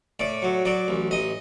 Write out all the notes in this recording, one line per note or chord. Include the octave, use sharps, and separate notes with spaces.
A2 D5
F#3
F#3 D5
A1
A1 D#5